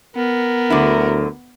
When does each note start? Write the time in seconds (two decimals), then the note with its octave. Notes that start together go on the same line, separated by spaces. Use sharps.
0.16 B3 A#4
0.70 D2 D3 F#3 E4